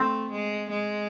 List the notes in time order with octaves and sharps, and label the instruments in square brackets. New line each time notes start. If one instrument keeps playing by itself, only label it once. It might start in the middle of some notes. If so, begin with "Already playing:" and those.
Already playing: [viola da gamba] A3 [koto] C4
[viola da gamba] G#3
G#3